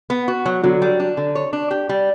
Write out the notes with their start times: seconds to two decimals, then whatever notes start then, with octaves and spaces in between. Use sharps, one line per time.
0.10 B3
0.28 F#4
0.46 F#3
0.63 D3 F#3
0.82 G3
1.00 D4
1.17 D3
1.35 C#5
1.53 D4
1.71 G4
1.89 G3